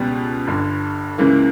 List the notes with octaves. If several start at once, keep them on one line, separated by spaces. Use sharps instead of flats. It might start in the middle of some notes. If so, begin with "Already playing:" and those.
Already playing: C#2 B2 G3 B3
G1 G2 D3
C#2 C#3 E3 A#3